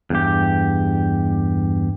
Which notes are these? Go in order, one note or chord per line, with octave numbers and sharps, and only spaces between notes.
E2 G2 G4